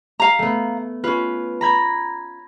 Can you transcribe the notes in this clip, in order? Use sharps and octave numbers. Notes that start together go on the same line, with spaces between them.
F5 A#5
A3 B3
C#4 F4 B4
A#5 B5 G#6